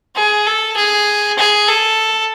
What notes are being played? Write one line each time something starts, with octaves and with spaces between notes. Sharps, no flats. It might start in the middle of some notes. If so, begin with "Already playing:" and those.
G#4
A4
G#4
G#4
A4